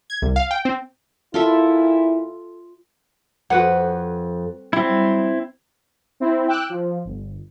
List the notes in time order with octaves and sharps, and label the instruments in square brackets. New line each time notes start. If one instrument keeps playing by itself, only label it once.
[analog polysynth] G#6
C2
F5
G5
C4
[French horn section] A#2 E4 [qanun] F4 A4 E5
[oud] F2 [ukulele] F#4 B4 F#5
[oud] F#3 G3 [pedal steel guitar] C4 E4
[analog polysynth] C4 E4
G5 D6 E6 F#6
F3
G1